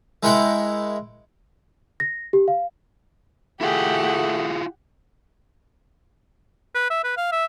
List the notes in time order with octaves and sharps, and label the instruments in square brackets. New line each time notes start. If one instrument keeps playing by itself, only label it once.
[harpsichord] G#3 E4 A#4 F#5 G5
[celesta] A#6
G4
F5
[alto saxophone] A3 [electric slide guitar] E4 F4 G#5 [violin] G4 F#5 [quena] G#4
[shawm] B4
E5
B4
F5
E5